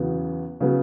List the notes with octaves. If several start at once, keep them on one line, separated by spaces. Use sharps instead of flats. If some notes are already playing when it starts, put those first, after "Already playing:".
Already playing: E2 C#3 F#3 B3
C#3 F#3 B3